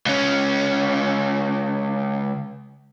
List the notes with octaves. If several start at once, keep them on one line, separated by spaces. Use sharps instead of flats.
C#2 C#4